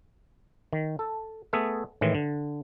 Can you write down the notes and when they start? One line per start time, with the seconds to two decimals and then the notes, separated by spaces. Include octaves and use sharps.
0.73 D#3
0.99 A4
1.53 A3 B3 G#4 A4 E5
2.01 A2 D#3 E3 G#3
2.15 D3